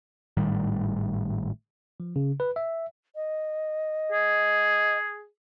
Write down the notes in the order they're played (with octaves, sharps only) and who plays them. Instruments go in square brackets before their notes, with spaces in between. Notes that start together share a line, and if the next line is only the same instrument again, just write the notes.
[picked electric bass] G#1 A2 D#3 G3
[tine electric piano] F3
C#3
B4
E5
[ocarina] D#5
[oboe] G#4